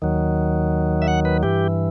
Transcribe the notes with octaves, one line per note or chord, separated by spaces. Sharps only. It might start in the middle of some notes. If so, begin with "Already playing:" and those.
D#2 D#3 F#3
E5
F#5
B4
G2 E3 G4